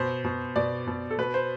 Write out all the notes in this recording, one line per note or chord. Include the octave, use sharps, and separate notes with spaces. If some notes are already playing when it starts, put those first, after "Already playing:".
Already playing: B2 C5
B2
B2 D5
B2
A4
B2 B4
C5